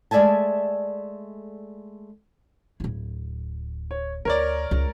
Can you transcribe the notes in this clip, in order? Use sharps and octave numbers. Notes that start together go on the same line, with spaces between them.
G#3 A3 D5 E5 G#5 A5
D1 E4
C#5
D2 A#4 C#5 D5
C#2